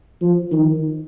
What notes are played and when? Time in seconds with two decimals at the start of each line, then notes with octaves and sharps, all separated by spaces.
0.21 F3
0.52 D#3